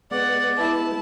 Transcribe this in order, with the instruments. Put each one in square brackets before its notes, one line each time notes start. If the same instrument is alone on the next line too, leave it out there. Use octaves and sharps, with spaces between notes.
[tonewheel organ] G#3 B3 [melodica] D5 [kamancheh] F#5
[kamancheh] E4 A5